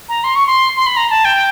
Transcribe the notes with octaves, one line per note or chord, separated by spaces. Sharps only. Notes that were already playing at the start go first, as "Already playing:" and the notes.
A#5
C6
C#6
C6
C6
B5
A#5
A5
G5